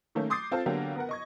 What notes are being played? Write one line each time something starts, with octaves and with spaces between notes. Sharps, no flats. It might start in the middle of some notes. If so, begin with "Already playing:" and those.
D#3 A3 A#3 C#4
C6 D6 D#6 G6 A6 C7
C4 F4 A4 A5
D3 F#3 A#3 B3 G4
B3 A#4 F#5
D#5 C#6 G#6